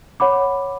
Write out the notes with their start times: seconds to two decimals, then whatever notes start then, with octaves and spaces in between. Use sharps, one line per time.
0.20 C#5 F#5 B5 D6